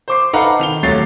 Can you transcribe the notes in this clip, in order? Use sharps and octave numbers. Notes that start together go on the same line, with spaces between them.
C5 D6 C7
D#4 A4 B4 F5 F#5 A#5
D#3 F7 G7
D#1 F#3 A3 A6 C7